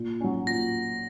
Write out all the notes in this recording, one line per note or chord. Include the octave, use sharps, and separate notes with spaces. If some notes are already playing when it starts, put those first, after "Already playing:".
Already playing: A#2
F#3 C#4
A#2 A#6